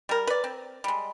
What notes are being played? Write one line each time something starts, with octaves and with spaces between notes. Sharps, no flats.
G3 A#4
B4 D5
C4
G3 G#3